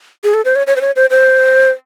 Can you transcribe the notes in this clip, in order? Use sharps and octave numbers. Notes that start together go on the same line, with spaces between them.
G#4
A4
C5
C#5
C#5
C5
C#5
C5
C5